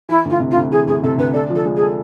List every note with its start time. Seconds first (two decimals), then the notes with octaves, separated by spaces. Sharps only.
0.09 E3 E4
0.25 D2 F4
0.40 C3
0.51 F4
0.56 D2
0.71 E3 G#4
0.87 D2 G#4
1.03 C3 A4
1.18 D2 B4
1.33 D4 A4
1.50 F3 A4
1.65 G#3
1.76 G#4
1.81 A4